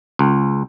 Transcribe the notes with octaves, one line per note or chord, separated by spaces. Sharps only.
C#2